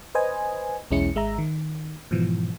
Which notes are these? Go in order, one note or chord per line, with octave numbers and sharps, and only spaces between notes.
B4 C5 D#5 G#5
B1 E2 G#3 C#4 E4 C#7
G#1 G#3 E5 A#5
D#3
G#2 B2 E3 F3